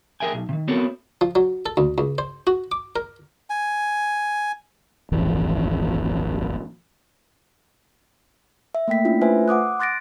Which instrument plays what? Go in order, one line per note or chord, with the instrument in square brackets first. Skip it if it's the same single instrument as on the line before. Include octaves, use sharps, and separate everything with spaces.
[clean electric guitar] G#4 A#4 E5 G5 G#5
B1
C3 D#3
B3 C4 F#4 A4 A#4 C#5
[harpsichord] F3
F#3
A4
D2
C#2
C5
F#4
D6
A#4
[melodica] G#5
[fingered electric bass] D#1 G#1 F2 E3
[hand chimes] E5
A3 A#3 G5 B6
C#4 D4 E4 F4
A3 F4 B4 C5 E5 G#5
F#5 D6 D#6 F#6
C6 F#6 A6 A#6 D7